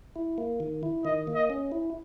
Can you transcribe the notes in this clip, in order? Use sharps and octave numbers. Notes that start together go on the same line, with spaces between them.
E4
A#3
D#3
E4
D#3 D#5
A#3
D#5
C#4
E4